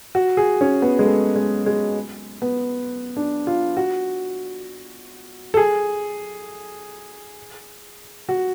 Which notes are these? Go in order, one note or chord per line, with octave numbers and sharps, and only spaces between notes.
F#4
G#4
C#4
B3
G#3
A3
G#3
G#3
B3
D4
F4
F#4
A4
G#4
F#4